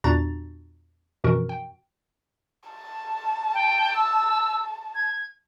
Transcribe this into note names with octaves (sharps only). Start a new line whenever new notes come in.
E2 A#2 D4 F#4 A#5 A6
A#1 F#2 B2 E3 F#4 A#4
G5
A5
G5
E6
G#6